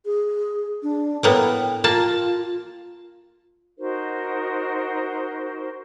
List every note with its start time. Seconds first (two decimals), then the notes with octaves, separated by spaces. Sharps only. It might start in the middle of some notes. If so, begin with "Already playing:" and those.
0.05 G#4
0.83 D4
1.23 A2 A#3 B3 G5
1.84 A#3 F4 A5
3.78 D#4 F#4 A#4 C5